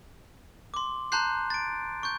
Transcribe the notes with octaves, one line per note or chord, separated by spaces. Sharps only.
C6 D6
A5 A#5 C6 F#6 G6 C7
A6 D7
C#6 G6